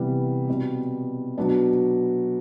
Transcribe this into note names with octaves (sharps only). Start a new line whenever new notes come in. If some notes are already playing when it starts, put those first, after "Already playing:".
Already playing: C3 E3 G3 B3
B2 G3 C4
B2 F#3 B3 D4